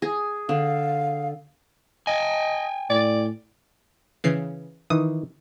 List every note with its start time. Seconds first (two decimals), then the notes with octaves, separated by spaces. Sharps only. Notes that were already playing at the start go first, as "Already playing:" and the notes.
0.02 G#4
0.49 D3 F5
2.07 D#5 G5 G#5
2.90 A2 D5
4.24 C#3 E3 C7
4.90 D#3 E3 D#6